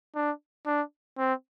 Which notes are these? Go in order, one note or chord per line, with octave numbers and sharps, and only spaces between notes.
D4
D4
C4